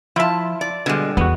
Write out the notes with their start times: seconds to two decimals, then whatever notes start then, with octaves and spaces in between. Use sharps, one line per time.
0.16 F3 E4 F4 E5 A5
0.61 D5
0.86 B2 D3 G3 G#3
1.17 E2 B3 F#4